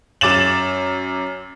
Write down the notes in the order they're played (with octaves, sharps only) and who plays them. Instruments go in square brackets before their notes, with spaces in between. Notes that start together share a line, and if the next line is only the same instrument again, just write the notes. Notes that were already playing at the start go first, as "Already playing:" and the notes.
[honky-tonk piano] F#2 D6 A6 E7 F#7